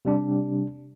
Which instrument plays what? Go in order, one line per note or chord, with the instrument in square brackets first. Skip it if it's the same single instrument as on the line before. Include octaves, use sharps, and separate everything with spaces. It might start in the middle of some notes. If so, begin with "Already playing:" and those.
[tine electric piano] C3 G3 D4